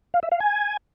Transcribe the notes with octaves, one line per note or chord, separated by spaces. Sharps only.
F5
E5
F5
G#5